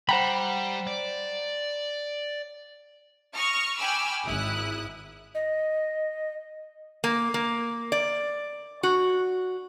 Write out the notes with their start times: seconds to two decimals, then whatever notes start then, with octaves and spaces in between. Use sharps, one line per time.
0.09 G3 C5 F#5 G5 A#5 B5
0.87 D5
3.36 C#6 D#6 F6 A#6
3.78 G5 G#5 B5 D6 E6 F6
4.24 G#1 E4 D#6 F#6
5.35 D#5
7.04 A#3
7.34 A#3
7.92 D5
8.83 F#4